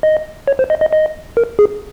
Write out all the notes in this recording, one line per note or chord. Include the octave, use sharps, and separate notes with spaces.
D#5
C#5
C5
D#5
D#5
D#5
A#4
G#4